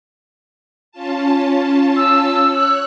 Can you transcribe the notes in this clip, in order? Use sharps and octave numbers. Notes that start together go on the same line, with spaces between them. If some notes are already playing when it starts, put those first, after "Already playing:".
C#4 F4 A5
E6
C#5 F#6